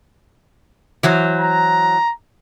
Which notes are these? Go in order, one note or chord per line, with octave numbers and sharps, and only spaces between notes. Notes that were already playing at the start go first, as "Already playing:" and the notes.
E3 F#3 C5
A#5